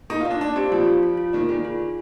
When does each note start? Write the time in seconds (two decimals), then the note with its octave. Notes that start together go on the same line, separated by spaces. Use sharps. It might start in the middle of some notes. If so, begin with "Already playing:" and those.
0.10 D#4 A#4
0.21 F4
0.25 D5
0.31 D4
0.41 D4 D5
0.56 C4 G4
0.72 F3 F4
0.87 F4
1.03 F4
1.17 F4
1.33 D#3 D5
1.49 D#3 G#4
1.65 F4
1.79 G#4